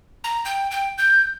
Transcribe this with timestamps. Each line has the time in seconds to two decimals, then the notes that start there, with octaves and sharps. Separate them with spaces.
0.24 A#5
0.45 G5
0.71 G5
0.98 G6